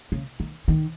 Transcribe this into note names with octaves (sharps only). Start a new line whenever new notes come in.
C#3
D#3
D#3